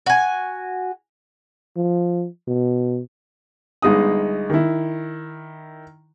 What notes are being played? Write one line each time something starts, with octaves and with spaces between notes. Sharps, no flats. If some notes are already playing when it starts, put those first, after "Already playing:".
F#4 G#5
F3
B2
G1 G#3 D#4 D#6
D#3 E4